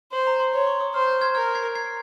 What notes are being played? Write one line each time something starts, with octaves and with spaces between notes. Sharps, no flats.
C5 C6
A#5
C6
C#5 C6
C#6
D#6
C5 F6
G6
F6 G#6
A#4 F6 G#6
G#6 C7
G#6 C7